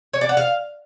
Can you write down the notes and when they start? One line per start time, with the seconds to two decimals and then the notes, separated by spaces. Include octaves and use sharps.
0.13 C#5
0.21 D5
0.29 F#5
0.37 F5